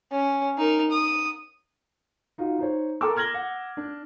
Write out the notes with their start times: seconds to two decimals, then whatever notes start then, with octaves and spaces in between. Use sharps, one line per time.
0.12 C#4
0.57 D#4 A#4
0.91 D#6
2.38 D#4 F4 F#4
2.59 D#4 C5 C#5
3.01 A4 A#4 G5 A#5 D6 E6
3.17 F6 G#6 A#6 F#7 G7
3.34 F#5
3.77 D4